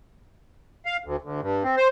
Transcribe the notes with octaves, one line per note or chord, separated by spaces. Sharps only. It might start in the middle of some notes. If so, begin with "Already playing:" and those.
F5
D2
D2
G2
C4
C5